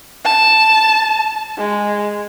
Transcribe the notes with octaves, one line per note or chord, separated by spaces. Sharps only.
A5
G#3